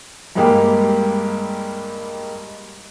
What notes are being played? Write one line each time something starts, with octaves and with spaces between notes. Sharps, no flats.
G2 G3 G#3 A#3 G4